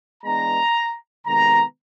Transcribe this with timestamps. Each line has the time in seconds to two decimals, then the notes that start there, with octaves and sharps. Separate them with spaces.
0.24 E3 G#3 B3 D4 A#5
1.27 C3 D#3 G#3 B3 A#5